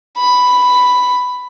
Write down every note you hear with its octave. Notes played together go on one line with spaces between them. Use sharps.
B5